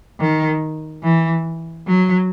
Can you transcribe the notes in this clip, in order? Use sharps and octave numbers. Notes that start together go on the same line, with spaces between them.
D#3
E3
F#3